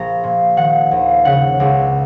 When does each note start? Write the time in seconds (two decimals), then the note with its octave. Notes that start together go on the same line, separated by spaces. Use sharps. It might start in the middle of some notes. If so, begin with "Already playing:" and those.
Already playing: A#1 A#5
0.23 A#2
0.57 D#3 F#5
0.91 D#2
1.25 C#3 F#5
1.60 C#2